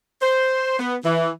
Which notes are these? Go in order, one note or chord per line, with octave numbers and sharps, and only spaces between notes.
C5
B3
E3